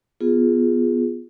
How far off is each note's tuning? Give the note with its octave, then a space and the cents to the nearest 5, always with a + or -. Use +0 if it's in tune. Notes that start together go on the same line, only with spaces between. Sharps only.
B3 +0 F4 +0 G#4 +0